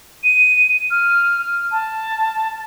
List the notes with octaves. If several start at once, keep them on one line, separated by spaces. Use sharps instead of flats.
D#7
F6
A5